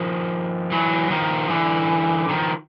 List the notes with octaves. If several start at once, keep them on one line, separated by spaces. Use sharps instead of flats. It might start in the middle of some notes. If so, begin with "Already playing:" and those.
Already playing: D#3 F3
E3 F#3
D#3 F3
D3 E3
D#3 F3